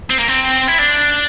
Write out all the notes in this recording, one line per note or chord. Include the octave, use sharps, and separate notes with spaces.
C4
A#3
C4
E4
D4